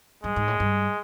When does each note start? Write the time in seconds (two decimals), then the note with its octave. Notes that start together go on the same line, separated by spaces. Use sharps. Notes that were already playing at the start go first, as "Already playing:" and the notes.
0.23 G2 G#3
0.36 G#2
0.48 A2
0.60 G2